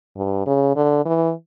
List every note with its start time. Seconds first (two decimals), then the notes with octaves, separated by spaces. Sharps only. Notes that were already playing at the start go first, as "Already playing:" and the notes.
0.17 G2
0.47 C#3
0.76 D3
1.05 E3